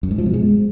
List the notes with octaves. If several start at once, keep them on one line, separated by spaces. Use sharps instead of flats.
F#2
G#2
F3
B2
G#3